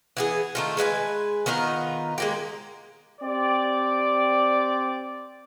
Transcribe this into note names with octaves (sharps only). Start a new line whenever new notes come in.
E3 B3 G#4
D#3 A3 F4
G#3 B4 D#5 G#5
D#3 B3 D#4 F4
G#3 A#3 G4
C4 G4 D5